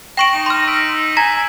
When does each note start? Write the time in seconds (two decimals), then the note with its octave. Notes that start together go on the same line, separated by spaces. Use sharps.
0.17 G5 C#6 A#6 D7 E7 F#7
0.34 D#4
0.46 C6 F6
0.67 E6 B6 D7
1.17 G#5 A#5 B6